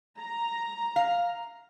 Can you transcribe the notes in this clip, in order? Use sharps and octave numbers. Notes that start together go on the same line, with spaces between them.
A#5
F5